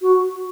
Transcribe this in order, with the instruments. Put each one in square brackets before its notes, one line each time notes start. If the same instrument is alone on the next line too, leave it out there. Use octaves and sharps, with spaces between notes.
[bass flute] F#4